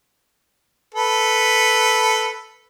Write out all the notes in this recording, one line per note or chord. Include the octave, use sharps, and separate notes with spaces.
A4 B4